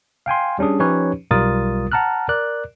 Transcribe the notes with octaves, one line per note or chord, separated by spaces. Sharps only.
F5 G5 G#5 C6
G3 C#4 D4 G#4
F3 C#4 D#4 G4 B4 C#5
B1 G3 F4 A#4 D#6 A6
F#5 A5 A#5 F6 F#6
A#4 D5 F#6